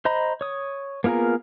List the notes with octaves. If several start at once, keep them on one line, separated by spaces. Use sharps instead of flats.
C5 D#5 A#5 B5
C#5 D#6
A#3 B3 F4 G#4 A#4